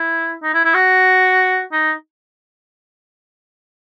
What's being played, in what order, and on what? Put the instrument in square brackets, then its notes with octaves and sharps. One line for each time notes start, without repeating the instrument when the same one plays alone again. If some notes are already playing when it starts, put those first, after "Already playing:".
Already playing: [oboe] E4
D#4
E4
E4
F#4
D#4